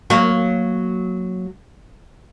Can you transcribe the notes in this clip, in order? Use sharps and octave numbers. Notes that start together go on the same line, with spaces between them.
F#3 A#3